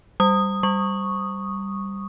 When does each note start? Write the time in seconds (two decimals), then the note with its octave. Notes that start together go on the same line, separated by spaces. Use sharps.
0.20 G3 D#6
0.63 G3 C#6